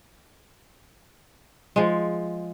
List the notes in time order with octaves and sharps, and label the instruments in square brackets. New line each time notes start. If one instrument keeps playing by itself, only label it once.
[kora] F3 G#3